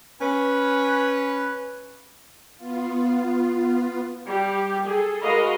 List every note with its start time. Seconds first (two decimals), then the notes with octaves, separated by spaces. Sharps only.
0.21 C#4 B4
2.56 B3 F4
4.25 G3 G4
4.86 G#4 A4
5.22 G#3 F#4 A#4 B4 D#5 F5